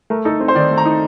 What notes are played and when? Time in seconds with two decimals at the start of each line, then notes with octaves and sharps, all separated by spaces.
0.10 A3 A#4
0.25 D#4 A4
0.40 C4
0.48 C5
0.55 D#3 D5
0.70 A3
0.78 A#5
0.85 D#4